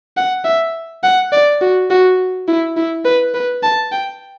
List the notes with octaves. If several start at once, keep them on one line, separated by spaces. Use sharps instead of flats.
F#5
E5
F#5
D5
F#4
F#4
E4
E4
B4
B4
A5
G5